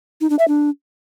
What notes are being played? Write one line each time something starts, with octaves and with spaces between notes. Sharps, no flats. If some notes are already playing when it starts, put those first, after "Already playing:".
D#4
D4
E5
D4